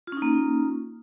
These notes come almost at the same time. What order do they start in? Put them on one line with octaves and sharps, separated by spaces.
F4 C#4 D#4 A#3